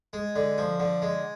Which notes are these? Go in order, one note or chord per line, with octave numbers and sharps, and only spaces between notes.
G#3
D3
F3
D3
G#3